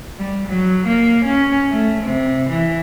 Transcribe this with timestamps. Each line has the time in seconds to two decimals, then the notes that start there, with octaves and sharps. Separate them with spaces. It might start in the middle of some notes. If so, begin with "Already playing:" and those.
0.18 G3
0.48 F#3
0.87 A#3
1.25 C#4
1.70 A3
2.03 C3
2.48 E3